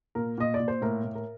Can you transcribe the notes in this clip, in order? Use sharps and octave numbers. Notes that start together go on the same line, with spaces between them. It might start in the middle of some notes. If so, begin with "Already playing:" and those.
A#2 A#4
A#2 D#5
D5
A#2
C5
A2 A#4
A2
A#4